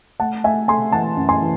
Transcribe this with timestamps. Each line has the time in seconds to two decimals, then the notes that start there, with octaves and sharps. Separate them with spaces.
0.20 A3 F#5 A5
0.44 A3 E5 G#5
0.68 A3 G#5 C6
0.92 E3 F#5 A5
1.17 F#2
1.29 G#5 C6
1.41 E3